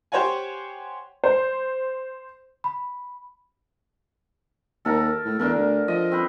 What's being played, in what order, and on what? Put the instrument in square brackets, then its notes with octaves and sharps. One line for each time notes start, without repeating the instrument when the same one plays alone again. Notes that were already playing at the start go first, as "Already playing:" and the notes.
[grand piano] G4 C5 C#5 F#5 G#5
[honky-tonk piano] C5
[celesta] B5
[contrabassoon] D#2 [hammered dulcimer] A4 A#4 A#5
[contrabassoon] A2
[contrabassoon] E2 [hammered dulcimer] D3 A#4
[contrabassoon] D2
[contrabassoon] F3 [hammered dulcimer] D#5
[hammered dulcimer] C4 B4